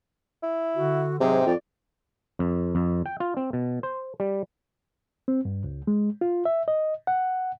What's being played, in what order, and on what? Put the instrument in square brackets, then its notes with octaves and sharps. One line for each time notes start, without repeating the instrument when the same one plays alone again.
[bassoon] E4
[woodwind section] D3 [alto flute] F#4
[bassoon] G#2 [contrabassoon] C3 [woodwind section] F#3 G#4 [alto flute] G5
[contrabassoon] F2 [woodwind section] D5
[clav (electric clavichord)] F2
F2
G5
F4
C4
B2
C5
G3
[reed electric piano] C4
G2
C#2
G#3
F4
E5
D#5
F#5